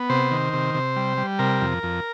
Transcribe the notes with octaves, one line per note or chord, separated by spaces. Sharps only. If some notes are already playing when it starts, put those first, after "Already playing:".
Already playing: B3
C3 C5
D#3
C3
C3
G3
G3
C3 A#4
F2
F2